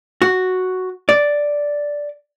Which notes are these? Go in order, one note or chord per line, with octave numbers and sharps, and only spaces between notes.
F#4
D5